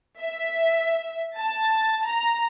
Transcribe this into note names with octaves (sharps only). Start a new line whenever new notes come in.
E5
A5
A#5